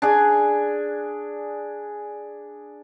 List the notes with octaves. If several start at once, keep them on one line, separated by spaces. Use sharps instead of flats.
D4 G#4 G#5